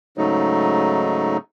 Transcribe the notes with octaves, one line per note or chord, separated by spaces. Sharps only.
G#2 C#3 F#3 A3 D#4